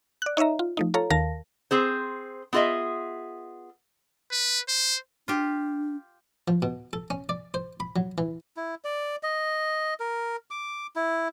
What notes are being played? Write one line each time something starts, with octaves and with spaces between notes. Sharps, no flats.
D5 F#6
D#4 C#5 D#5 E5 A#5
F4
F3 A3 D#4
F4 A4 C#5 F5 A#5
D#2 D#3 A#4 F5 A5 A#6
C4 G#4 C5
B3 F4 G#4 D#5 E5
B4
C5
D4 F4 G4
F3
B2
A4
C#4
D5
C5
B5
F#3
E3
E4
D5
D#5
A#4
D6
E4